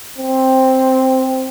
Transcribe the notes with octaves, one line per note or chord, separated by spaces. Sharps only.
C4